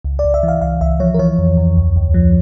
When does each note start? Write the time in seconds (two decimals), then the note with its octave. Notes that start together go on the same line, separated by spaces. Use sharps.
0.05 C#2
0.19 D5
0.24 C#2
0.34 E5
0.43 E3
0.48 F5
0.61 C#2 F5
0.81 C#2 E5
1.00 F3 C#5
1.14 A#4
1.19 E3 C#5
1.38 F2
1.57 F2
1.76 D2
1.96 D2
2.14 F3